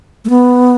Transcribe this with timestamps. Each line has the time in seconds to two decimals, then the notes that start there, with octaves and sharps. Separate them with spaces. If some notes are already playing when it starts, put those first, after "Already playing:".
0.25 A3
0.29 B3